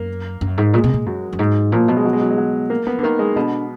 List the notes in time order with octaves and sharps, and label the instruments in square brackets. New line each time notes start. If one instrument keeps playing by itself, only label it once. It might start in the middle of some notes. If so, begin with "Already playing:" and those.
Already playing: [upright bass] F#2 [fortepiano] A#3
[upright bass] F#2
G#2
[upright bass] A#2 [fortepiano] G#3
[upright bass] B2
A#2
[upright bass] F#2 [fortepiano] F#3
[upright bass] F#2
G#2
[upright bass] A#2 [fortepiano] F3
[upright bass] B2 [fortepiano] F#3
[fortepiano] G#3
F#3
G#3
F#3
G#3
F#3
A#3
[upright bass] F3 [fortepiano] B3
[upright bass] D3
[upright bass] D#3 [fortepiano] A#3
[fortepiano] G#3
[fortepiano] B2 [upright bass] D3